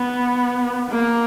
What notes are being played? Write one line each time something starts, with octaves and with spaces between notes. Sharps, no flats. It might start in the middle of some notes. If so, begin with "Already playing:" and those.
Already playing: B3
A#3